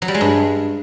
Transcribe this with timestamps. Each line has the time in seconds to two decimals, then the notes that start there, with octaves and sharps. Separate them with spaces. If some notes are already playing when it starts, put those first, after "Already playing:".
0.02 F#3
0.08 G3
0.14 G#3
0.21 G2